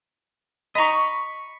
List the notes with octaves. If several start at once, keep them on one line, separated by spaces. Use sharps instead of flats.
D#5 A#5 B5 C#6